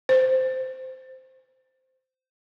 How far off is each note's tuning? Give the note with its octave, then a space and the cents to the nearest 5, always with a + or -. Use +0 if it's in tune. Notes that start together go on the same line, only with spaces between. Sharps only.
C5 -15